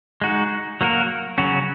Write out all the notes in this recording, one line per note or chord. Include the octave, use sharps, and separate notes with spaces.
G#3 D#4 F#4
F#3 A#3 F#4 A#4
C#3 F#3 C#4 F#4